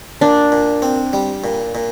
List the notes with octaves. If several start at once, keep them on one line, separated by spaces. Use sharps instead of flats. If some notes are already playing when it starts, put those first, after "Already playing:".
A#2 D4
A#2
C4
G3
A#2
A#2